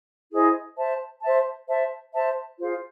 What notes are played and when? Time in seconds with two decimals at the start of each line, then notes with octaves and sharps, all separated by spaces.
0.32 E4 G#4 C5 D#5
0.77 C5 E5 A5
1.22 C5 E5 A5
1.67 C5 E5 A5
2.13 C5 E5 A5
2.59 F4 G#4 C5 F5